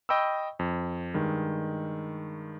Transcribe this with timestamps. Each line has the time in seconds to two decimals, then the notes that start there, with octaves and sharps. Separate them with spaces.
0.09 D#5 G5 B5 C#6 E6
0.59 F2
1.14 G2 D#3 G#3